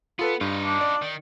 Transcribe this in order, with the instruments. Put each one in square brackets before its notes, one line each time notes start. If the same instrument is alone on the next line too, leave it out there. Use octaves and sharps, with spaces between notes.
[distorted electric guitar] B3 [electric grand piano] F4 A4 B4
[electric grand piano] G2 [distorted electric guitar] D#4 F4
[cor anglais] D4
[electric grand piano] D5
[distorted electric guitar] D#3